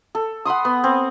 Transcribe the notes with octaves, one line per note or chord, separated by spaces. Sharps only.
A4
F#5 B5 C6 D#6
B3
C4